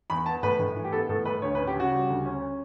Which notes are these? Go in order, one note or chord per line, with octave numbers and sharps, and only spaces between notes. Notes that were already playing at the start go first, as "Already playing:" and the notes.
E2 B5
B3 A5
A2 B4
A2
E3
G4
B3 A4
A2 A4
A2 B4
D2 C#5
B4
C#4
G4
C#3 F#4
G3
D2
C#4